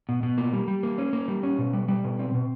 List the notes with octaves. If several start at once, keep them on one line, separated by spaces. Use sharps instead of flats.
B2
B2
A#3
G3
G3
A#3
C#4
A#3
G3
C#4
B2
G3
G3
B2
C4
B2